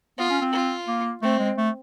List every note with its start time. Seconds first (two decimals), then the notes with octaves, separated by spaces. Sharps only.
0.18 B3 F4
0.30 C#4
0.41 C4
0.53 F4
0.88 A#3
1.22 A3 C4
1.39 G#3
1.58 A3